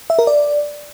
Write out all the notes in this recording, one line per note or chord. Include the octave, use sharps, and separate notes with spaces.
E5
A#4
D5